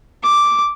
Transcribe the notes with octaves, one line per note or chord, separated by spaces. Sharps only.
D6